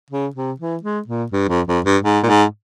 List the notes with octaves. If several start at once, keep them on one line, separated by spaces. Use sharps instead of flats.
C#3
C3
E3
G#3
A#2
G2
F2
F2
G2
G#2
A#2
G#2